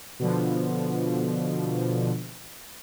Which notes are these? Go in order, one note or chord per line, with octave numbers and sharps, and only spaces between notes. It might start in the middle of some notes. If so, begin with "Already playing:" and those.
B2 D3 F3